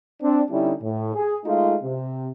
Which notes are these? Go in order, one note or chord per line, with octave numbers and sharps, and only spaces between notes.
C4 D4
D3 G3 C#4 D#4 E4
A2
G#4
G#3 A3 D#4 F4
C3